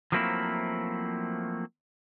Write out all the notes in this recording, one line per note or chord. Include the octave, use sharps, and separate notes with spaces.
F3 F#3 A3 A#3 C4 E4